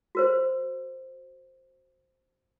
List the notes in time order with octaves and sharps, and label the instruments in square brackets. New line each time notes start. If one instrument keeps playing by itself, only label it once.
[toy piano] F#4 A#4 C5